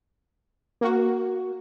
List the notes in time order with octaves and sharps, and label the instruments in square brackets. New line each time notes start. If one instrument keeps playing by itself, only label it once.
[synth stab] A#3 F#4